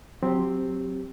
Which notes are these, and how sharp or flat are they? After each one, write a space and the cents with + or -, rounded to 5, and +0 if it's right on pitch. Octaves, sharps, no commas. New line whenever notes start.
F#3 -20 C4 +0 G4 +0